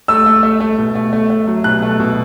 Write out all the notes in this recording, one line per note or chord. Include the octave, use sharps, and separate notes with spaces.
A3 E6
A3
A3
A3
B2
A3
A3
A3
F#3
B2 F#6
A3
B2